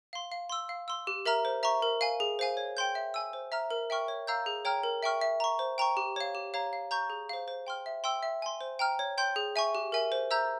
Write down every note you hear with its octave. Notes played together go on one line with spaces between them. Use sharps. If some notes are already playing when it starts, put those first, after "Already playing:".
F5 C6
F5
C6 E6
F5
C6 E6
G4
A#4 E5 A#5 F6
C5
E5 A#5 C#6
A#4
F5 G#5
G#4
C5 F5 G#5
C#5
G5 C6 G6
E5
G#5 E6
C5
E5 A#5 F6
A#4
E5 G5 C#6 F6
C#5
F5 A#5 E6 G6
G#4
C#5 G5 A#5 F6
A#4
E5 G5 C#6 F6
E5
A#5 C#6
C5
G5 A#5 C#6
G4
C#5 F5
G4
C#5 F5 A#5
F5
A#5 C#6 G6
G#4
C5 F5
C5
G5 C6 F6
E5
G5 C6 E6
E5
G#5 C6
C5
G5 A#5 F6
C#5
G5 C6 G6
G#4
E5 G#5 C#6
G4
A#4 E5 G#5
C5
E5 A#5 E6 G6